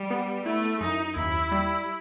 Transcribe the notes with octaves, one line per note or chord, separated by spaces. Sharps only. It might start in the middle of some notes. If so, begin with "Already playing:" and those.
Already playing: G3
B3
A3 E4
F#2 D#4
D#2 E4
G3